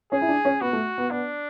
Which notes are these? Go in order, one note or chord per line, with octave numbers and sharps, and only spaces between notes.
C#4 G#4
E4
D4
C#4
B3 F#4
A3
B3
B3 D4